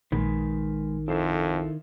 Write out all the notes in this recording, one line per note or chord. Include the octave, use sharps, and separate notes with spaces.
A#1 D#3 G#3 B4
F2 E4 A4 C5